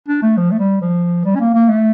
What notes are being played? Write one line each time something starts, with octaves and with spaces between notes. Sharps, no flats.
D4
A3
F3
A3
G3
F3
G3
C#4
A#3
A#3
A3